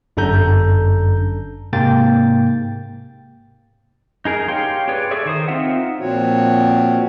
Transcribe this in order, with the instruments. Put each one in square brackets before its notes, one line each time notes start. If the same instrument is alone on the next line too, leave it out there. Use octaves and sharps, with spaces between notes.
[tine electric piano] G1 F#2 D4 A4 A#5 G6
G#2 C3 A#3 G5 A6
[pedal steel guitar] D#4 G#4 A#4
G4 C#5 F5 G5 C6
G4 G#4 B4 C#5 D5
G#4 A4 C#5 D5 E5
D#3 C5 D#6
C4 D#4 F4 E5 F#5
[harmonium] A#2 F3 C4 F#4 C#5